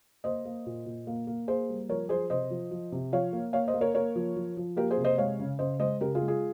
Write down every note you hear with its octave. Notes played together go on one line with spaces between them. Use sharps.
A#3 C5 D#5
A#3
A#2
A#2
A#3
A#3
A#3 G#4 C5
G3
F3 A#4 C#5
F3 G#4 C5
C3 C5 D#5
F3
F3
C3
F3 C#5 F5
A#3
A#3 C#5 F5
C5 D#5
A#3
A#4 C#5
A#3 A#4 C#5
F3
F3
F3
A#3 G4 A#4
G#4 C5
C3
C5 D#5
G#3 C#5 F5
C#3
C#3 C5 D#5
G#3 C5 D#5
C#3 G4 A#4
F4 G#4
G#3
F4 G#4